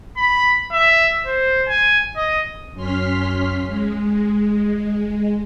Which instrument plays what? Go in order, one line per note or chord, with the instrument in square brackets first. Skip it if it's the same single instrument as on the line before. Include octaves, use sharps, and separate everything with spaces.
[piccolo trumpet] B5
E5
C5
G#5
D#5
[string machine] F#2 C#4 C6 F6 B6
G#3